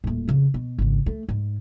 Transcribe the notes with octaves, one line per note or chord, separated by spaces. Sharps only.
D#1 A2
F2 C#3
B2
G#1 C#3
A3
G#2